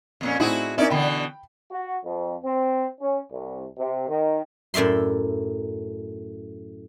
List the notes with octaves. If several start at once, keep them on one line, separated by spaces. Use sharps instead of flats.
F2 A#2 C#4
A2 C4 D#4 E4 F#4 G#4
C#4 D#4 E4 A#4 D5 E5
B2 D3 E3 G5 B5
F#4
F2
C4
C#4
C2
C3
D#3
F#2 A2 D5 E5 C6